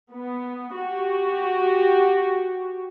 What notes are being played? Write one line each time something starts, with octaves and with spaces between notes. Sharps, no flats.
B3
F#4 G4